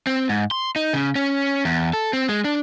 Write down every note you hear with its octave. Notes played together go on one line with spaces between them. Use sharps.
C4
G#2
C6
D#4
C#3
C#4
E2
A4
C4
G#3
D4